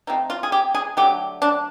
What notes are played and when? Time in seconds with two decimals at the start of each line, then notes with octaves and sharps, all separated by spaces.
0.07 F3 A3 C4 D#4
0.30 F4
0.43 G#4
0.52 G4
0.75 G#4
0.97 D3 F#3 A3 G4
1.42 D4